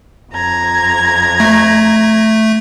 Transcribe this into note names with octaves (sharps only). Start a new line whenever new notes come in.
F2 A#5 G#6
A3